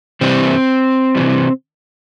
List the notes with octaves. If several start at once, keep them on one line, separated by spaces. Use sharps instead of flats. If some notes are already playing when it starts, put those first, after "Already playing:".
C3 E3 G3 C4
C3 E3 G3